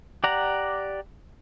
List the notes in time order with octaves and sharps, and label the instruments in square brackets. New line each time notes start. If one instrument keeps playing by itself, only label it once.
[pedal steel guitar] G4 D5 F#5 A#5